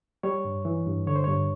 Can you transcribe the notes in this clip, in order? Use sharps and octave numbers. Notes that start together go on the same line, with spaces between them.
G3 C#5
G2
E3
G2
D3 C#5
C5
G2 C#5